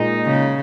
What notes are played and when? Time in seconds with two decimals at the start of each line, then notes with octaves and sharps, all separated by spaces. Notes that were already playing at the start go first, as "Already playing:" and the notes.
Already playing: A#2 G#3 D#4
0.26 C#3